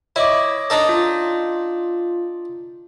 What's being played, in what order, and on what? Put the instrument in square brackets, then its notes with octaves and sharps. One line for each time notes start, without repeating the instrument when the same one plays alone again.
[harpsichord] E4 [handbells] C#5 D#5 D6
[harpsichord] D4 D#4 A4
[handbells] F4